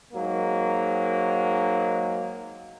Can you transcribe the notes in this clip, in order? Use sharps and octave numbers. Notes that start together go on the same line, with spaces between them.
G#2 F#3 G#3 A#3